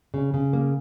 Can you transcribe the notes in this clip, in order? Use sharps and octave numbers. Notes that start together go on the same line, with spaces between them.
C#3
C#3
A#3